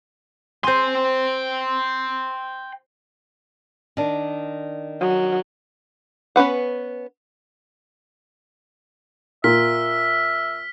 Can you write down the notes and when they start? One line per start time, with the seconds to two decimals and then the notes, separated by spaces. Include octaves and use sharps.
0.64 C5 G5 G#5 C6
3.97 D#3 D4
5.01 F#3
6.36 B3 C#4 B4 F#5
9.44 A#2 E5 F6 B6